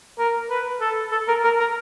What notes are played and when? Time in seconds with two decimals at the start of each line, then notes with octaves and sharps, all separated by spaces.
0.19 A#4
0.50 B4
0.81 A4
1.12 A4
1.28 A#4
1.44 A#4
1.60 A#4